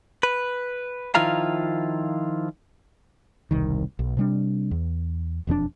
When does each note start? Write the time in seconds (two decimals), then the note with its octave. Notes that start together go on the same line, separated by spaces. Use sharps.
0.23 B4
1.15 D#3 F3 E4 F4 F5 A#5
3.51 E1 C2 D#3
3.99 B1
4.17 C3 G3 D4
4.71 E2
5.47 E1 F2 G3 D4